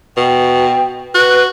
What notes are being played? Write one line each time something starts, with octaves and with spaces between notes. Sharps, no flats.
B2 G5
F#4 B4